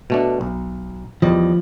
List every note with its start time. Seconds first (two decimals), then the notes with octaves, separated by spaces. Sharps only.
0.10 B2 A3 D4
0.41 B1
1.22 E2 F3 G3 D#5